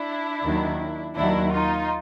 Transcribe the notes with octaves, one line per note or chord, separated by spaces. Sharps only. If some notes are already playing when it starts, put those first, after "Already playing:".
Already playing: D4 E4
D#2 D#3 F#3
D#2 D#3 F#3 D4 E4
D#4 F4